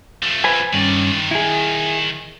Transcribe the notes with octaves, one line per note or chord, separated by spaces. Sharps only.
F3 A3
B4 C5 G#5
G2 D#3 C#4 D5
E4 G#4